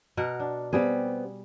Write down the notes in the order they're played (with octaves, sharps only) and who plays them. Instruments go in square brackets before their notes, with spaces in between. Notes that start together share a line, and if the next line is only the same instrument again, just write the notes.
[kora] B2 A#4 F#5
D4
[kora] G3 G#4 [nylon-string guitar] B3 C4 G4